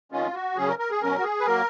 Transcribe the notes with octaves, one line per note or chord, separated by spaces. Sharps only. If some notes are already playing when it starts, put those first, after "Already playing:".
F2 D#3 G#3 C#4 F4
F#4
C#3 F#3 C#4 G#4
A#4
A#4
G#4
B2 F#3 C#4 A#4
F#4
G#4
B4
F#3 A#3 A#4